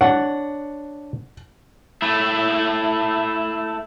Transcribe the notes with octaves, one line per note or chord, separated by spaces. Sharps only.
D4 C#5 F#5
A3 E4